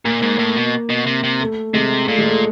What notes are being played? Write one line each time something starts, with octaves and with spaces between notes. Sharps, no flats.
A#2 A#3
G#2
A2
B2
B2
C3
C3
A3
C3 G#3
A#2 A3
G#3
A3